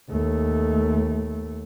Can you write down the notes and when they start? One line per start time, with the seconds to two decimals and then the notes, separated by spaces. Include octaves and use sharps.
0.10 D#2 A3